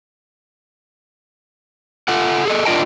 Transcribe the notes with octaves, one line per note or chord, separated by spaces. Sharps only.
F4 A4 F#5
G#4 A4 D#5
D4 F4 A#4 D#5 G5 A5